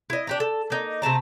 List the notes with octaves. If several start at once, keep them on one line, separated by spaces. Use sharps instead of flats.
E4 D#5
D4 G4 A#5
A4
A#3 D#4
C3 A3 A5 A#5